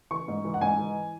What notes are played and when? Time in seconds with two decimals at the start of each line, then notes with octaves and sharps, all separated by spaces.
0.11 E3 C#6
0.28 G#2
0.45 E3
0.54 F#5
0.61 G#2 G#5
0.78 E3